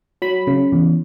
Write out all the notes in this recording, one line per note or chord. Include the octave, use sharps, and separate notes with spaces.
F#3 B5
C#3
E2